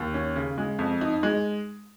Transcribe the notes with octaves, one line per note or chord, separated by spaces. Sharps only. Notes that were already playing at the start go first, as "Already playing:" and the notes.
Already playing: D#2
C#4
C#3
G#3
F2
D#4
G#3